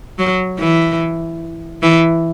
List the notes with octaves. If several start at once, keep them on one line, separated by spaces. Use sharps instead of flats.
F#3
E3
E3